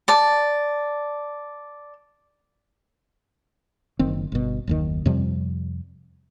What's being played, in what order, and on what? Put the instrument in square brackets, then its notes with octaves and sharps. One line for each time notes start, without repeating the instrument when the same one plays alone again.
[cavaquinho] D5 A5
[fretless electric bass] F#1 D#3 C4
G1 B2
F#1 D#2 D#3
F2 C3 F3 G3